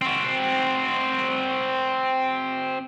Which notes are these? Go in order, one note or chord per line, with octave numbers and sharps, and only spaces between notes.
C4 F#4